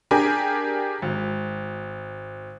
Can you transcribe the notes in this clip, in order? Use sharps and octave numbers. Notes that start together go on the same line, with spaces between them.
D4 G4 G#4 A#4 G#5
G#1